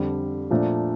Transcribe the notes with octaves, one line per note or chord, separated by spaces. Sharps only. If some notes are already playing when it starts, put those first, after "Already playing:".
Already playing: F2 D3 G3
A#2 F3 A3 D4